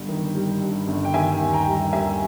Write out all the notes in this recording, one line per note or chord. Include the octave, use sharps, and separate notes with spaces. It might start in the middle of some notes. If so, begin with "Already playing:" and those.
Already playing: G1 G2
D#3
G3
G2
G1
G5
D#3 E5 G#5
D#2
G5 A#5
G3
D#2 E5 G#5